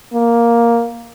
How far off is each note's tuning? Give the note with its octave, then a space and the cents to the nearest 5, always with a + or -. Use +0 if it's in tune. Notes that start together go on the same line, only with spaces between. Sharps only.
A#3 +5